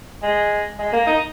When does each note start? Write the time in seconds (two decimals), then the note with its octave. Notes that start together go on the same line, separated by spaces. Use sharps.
0.23 G#3
0.79 G#3
0.93 A#3
1.07 D#4